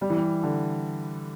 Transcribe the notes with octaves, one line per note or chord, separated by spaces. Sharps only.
G3
E3
G3
D3